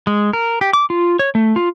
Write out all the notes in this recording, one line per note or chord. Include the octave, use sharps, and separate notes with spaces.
G#3
A#4
G4
D6
F4
C#5
A3
F4